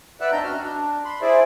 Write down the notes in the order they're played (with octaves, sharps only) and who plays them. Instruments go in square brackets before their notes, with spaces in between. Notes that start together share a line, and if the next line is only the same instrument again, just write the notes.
[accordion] B4 D5 E5 F#5 E6 F#6
D#2 C4 D4 D#4 A#5 G6
F#2 F#4 F6
D4
B5 C6
E4 G#4 C5 D5 E5